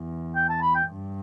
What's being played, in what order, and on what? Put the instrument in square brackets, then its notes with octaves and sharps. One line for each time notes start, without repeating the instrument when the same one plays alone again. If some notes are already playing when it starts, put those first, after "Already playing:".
Already playing: [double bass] E2
[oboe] G5
A5
B5
G5
[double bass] G2